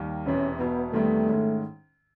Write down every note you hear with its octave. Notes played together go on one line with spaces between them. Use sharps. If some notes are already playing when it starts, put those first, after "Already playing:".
Already playing: D#2 D#3 G3 A#3
E1 E2 C3 E3 C#4
E1 E2 B2 B3
E2 C3 D#3 G3 A3 B3
G#2 D#3 G#3 C#4 E4